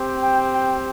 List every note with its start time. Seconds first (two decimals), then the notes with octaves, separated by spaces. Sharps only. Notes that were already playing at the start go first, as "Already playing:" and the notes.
Already playing: C4 G4
0.22 G5
0.52 G5